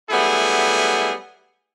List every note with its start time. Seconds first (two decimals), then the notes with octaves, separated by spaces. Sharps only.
0.10 F#3 G3 A3 B3 E4 G#4